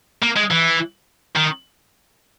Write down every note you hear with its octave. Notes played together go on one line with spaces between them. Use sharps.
A#3
G#3
E3
D#3